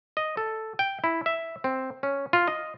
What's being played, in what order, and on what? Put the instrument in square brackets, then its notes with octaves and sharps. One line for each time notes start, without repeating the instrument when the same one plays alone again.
[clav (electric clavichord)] D#5
A4
G5
E4
E5
C4
C#4
F4
D#5